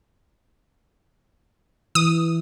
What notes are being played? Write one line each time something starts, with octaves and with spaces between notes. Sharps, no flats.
E3 D#6